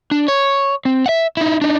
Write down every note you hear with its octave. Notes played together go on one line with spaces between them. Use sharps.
D4
C#5
C4
E5 F#5
D#4 E4
D4 D#4